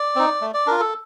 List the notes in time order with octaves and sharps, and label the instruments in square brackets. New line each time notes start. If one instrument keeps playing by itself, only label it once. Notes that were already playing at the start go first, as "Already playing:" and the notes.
Already playing: [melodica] D5
C4 D#4
A3
D5
D4 F4 A#4
A4